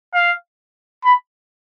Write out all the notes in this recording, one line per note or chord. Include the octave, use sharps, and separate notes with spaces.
F5
B5